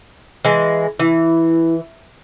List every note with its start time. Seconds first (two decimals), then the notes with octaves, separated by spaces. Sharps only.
0.45 E3 G#3
0.99 E3 E4